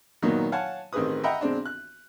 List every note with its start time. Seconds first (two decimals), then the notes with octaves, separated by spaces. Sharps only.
0.22 A#2 D#3 F#3 B3 D#4
0.52 C#5 F5 F#5 G#5 A5
0.93 A1 D#3 C4 G#4 B4 D#6
1.24 D#5 E5 F#5 G5 A#5 B5
1.41 B1 G#3 C4 D4
1.65 F#6